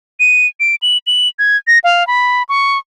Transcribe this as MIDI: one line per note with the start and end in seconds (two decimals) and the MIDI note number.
0.20 0.47 99
0.60 0.75 98
0.82 0.98 102
1.07 1.28 102
1.39 1.57 92
1.67 1.79 94
1.84 2.06 77
2.07 2.43 83
2.49 2.78 85